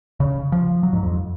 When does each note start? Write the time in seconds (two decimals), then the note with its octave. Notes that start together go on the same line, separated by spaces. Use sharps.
0.20 C#3
0.52 F3
0.83 F#3
0.93 G#2
1.03 F2